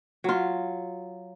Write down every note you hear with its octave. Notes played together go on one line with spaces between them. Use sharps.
F#3 F4